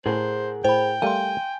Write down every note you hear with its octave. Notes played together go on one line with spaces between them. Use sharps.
A2 G#4 A#4 C5 F#5
A2 C5 G5 B5
G3 A3 A#4 F5 G#5 C6